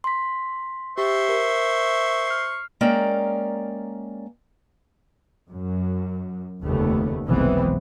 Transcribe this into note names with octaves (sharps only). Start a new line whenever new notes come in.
C6 B6
G4 C5 E5 C#6
A#4
F6 C7
G#3 A#3 C#4 A#4 D5 G5
F#2
F1 D#2 C#3 A3 B3
F1 B1 E3 G#3 B3 C4